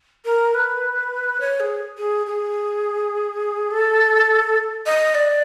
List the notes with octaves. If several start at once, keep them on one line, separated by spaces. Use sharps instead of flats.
A#4
B4
C#5
G#4
G#4
G#4
A4
D#5
D5